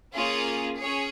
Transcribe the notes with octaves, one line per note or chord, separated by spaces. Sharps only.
A#3 C#4 F4 G#4
C#4 G#4 C#5